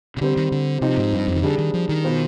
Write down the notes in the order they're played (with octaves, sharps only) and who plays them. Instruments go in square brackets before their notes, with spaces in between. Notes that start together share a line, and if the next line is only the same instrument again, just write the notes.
[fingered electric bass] C3
[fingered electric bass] D3 [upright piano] G3 C4 G4 C5
[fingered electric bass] D#3
D3
[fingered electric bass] C3 [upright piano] F3 C4 D#4 G4
[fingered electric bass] G#2
G2
F2
D#3
[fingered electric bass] D3 [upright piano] G3 D4 G#4
[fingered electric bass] D#3
F3
D#3
[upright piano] B2 B3 F4 C5